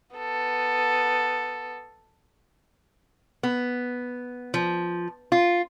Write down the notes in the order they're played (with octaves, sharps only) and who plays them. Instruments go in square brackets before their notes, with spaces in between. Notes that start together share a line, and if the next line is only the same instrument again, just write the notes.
[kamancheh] B3 A4
[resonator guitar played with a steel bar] B3
F3
F4